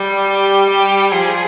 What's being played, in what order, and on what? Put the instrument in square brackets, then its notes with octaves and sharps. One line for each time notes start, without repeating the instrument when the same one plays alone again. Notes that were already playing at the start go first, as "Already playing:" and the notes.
Already playing: [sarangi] G3
[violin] G4
[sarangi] G3 [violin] G4
[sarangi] F3 [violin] G#4